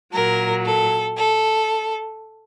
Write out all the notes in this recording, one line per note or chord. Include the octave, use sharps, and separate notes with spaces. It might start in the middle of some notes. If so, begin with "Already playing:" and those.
A#2 F#3 A#4
A4
A4